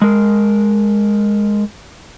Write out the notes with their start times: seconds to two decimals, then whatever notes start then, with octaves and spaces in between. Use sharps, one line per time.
0.02 G#3 A#4